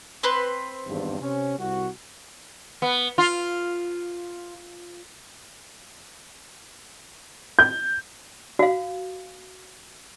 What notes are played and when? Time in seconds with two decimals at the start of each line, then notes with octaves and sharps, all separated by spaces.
0.23 C4 B4 C6
0.87 G#1 E2 G2
1.20 C3 C#4
1.59 C2 F#4
2.82 B3
3.18 F4
7.59 G6
8.59 F#4 F5